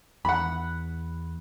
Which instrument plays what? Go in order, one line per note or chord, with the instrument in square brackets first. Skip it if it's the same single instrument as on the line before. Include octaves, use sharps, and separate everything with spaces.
[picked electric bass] E2 [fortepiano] F#5 B5